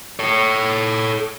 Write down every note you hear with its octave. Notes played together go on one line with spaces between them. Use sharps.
A4 C#5